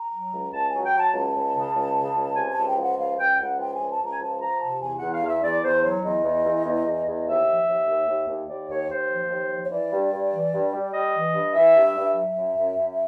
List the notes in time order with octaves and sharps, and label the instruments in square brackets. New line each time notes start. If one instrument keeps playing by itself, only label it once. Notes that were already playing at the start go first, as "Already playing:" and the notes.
Already playing: [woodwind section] A#5
F#3
C#2
C#2 A5
F#3 G#5
G5
F#3 A5
C#2 A5
C#2
C#3
C#2
C#3
C#2
C3 G#5
A5
C#2
G5
F3
F#5
C#2 F5
C#2 G5
C#2 F#5
F3 G5
G#5
C#2
A5
C#2
A#5
G#5
F3 A5
F3 A#5
C3 A5
E2 G#5
E2 F#5
F5
E2 E5
E2 D5
E2 C5
F#3 C#5
E2 D#5
E2
E2
E2
E2
E2
D#2 E5
F3
D#2
D#2
D#2
D#2
D#2 D5
D#2 C#5
D#2 C5
F3
D#2
F3
C#5
E3 D5
G2
G2
E3
G2
G3
G3 D#5
E3
G2
E3 E5
G2
G2
F#3 E5
F#2
F#2
F#2